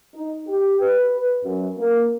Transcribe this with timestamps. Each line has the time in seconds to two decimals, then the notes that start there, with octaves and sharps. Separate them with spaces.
0.14 D#4
0.47 G4
0.80 B4
1.43 F#2
1.77 A#3